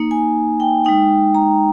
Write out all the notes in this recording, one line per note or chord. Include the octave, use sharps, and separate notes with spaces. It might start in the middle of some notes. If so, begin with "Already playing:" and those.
Already playing: A#3 D#4
G#5
G5
G#3 D#4 G5
A#5